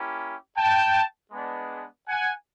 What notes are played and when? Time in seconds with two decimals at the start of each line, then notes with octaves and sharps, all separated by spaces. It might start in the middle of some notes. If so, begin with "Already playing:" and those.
Already playing: A#3 C#4 E4 G4
0.57 G5 A5
1.31 G#3 B3 D4
2.08 F#5 G#5